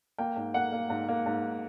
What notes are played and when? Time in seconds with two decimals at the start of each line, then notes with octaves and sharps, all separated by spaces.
0.18 A#3 G5
0.36 G#2
0.54 A#3 F#5
0.72 A#3
0.90 G#2
1.08 A#3
1.26 G#2